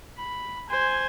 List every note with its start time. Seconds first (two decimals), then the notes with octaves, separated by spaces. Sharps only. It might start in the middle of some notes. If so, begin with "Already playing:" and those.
0.18 B5
0.69 C5 G#5